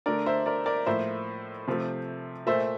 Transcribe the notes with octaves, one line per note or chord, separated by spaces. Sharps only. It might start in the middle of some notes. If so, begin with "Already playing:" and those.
D3 A3 A#4 D5
C5 E5
A#4 D5
A#4 D5
A2 F3 A#3 C5 E5
C3 F3 A3
A#2 A3 C5 E5